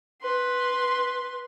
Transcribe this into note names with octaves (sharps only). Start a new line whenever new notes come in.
B4 C6